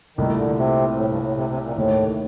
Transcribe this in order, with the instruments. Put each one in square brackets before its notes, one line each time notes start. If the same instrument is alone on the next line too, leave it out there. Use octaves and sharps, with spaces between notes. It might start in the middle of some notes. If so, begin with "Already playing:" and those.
[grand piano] C2 A#2 A3 [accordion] D#3
[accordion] D3
C3
A2
G2
A2
C3
C3
A#2
[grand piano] D#2 D#3 A3 [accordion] A2